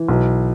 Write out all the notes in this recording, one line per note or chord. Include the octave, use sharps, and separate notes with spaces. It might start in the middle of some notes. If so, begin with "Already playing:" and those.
Already playing: E3
B1